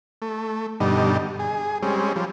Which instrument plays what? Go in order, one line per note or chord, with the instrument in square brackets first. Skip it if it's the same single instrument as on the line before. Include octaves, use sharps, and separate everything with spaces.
[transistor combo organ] A3
G2 B2 D3 G3 D#4
G#4
G3 G#3 C4 C#4
F3 G3